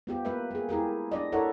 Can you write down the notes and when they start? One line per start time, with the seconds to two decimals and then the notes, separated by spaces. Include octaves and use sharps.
0.07 B3 F4 G4
0.25 A#3 B4 E5
0.51 A#3 G#4
0.69 E4 G4 G#4 A#4
1.11 D4 D5 D#5
1.32 E4 A4 A#4 C#5 E5 F#5